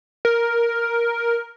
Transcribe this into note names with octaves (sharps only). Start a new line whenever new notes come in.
A#4